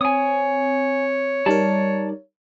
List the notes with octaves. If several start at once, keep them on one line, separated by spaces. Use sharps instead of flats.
C4 C#5 G#5 D#6
G3 D#4 A#4 D5 A5